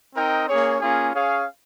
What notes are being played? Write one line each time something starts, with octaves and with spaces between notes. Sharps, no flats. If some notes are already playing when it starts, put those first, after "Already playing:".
C4 D#4 A#4 D#5 G5
A#3 C#4 G#4 C#5
A#3 C#4 F4 G#4
C#4 G#4 C#5 F5